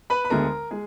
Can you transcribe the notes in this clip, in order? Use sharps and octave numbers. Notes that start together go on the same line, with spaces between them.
B4 B5
B5
D2 D3 G#3 B3 A#4 A#5
G#3 G#4